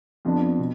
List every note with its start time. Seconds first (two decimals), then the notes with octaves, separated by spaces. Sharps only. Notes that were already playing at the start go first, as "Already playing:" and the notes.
0.25 F2 F3 B3 D4
0.59 B2